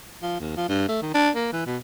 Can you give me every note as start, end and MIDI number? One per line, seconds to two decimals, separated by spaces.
0.23 0.38 53
0.40 0.55 39
0.57 0.68 53
0.69 0.88 43
0.89 1.02 57
1.02 1.14 51
1.14 1.30 62
1.35 1.51 58
1.53 1.66 52
1.66 1.77 47